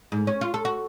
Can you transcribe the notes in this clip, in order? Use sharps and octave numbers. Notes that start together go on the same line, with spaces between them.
G#2
C#4
F4
A4
F#4